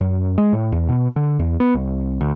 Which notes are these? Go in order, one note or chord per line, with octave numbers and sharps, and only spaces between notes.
F#2
G#3
A2
E2
B2
D3
E2
B3
C2
D2